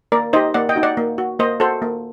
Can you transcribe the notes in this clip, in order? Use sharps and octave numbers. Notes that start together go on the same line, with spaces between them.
A#3 A#4 D5
D#4 G4 C5 D#5
A#3 D5 F#5
D#5 G5
D#4 F#4
D5 F#5
A#3
F#4
A#3 C5 D#5
F#4 A4 C5
A#3